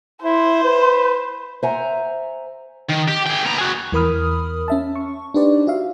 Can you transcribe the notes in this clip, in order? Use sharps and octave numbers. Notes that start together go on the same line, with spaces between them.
E4 C5
B4
C5 E5 F#5 G#5 A#5
D#3
G4
G#4 G5
B3 A#5
F#4 G#4
E2 E3 A#4 B5 D#6 F6
C#4 E5 A5
C#6
D4 D#4 G4 B4 C5 D5
F4 F#4 E5 F5